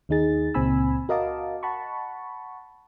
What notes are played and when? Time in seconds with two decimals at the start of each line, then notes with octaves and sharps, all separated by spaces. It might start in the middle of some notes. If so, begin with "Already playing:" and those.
0.09 D#2 D#3 D#4 G#4 A6
0.54 C#2 A#2 C4 G#5 B5 E6
1.09 F#4 A#4 D#5 F5 A5 D6
1.63 F#5 A5 B5 C#6